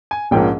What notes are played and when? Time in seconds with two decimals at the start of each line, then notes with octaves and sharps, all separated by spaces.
0.11 G#5
0.31 A#1 G#2 F3 A#3 C#4 G5